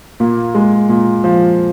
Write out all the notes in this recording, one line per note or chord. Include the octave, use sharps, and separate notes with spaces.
A#2 A#3
G#3
A#2
F3